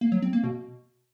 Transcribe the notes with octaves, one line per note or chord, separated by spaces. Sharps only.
A#3
F#3
C4
A#3
B2